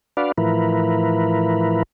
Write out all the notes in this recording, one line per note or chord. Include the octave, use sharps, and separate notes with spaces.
D4 F#4 B4 D5 F5
A2 E3 F3 E4 A#4 B4